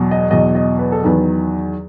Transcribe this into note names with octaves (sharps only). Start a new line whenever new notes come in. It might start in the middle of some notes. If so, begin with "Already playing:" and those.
Already playing: E2 B2 F#3
D#5
E2 B2 F#3 D#5
D#5
B4
A4
E2 D#3 F#3 B4